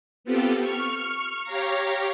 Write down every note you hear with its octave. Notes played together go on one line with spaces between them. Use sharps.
B3 C4 F4 G4 A4
C#6 F6
G4 C#5 F5 A#5